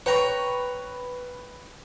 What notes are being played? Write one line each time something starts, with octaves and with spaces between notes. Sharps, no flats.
B4 C#5 G5 A#5 C#6